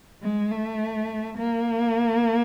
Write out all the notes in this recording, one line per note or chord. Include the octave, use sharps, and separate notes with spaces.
G#3
A3
A#3